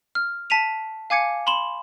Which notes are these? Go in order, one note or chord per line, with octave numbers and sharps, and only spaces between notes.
F6
A5 B6 D#7 F7
F5 G#5 D6 G#6 C#7
B5 C6 E7 F#7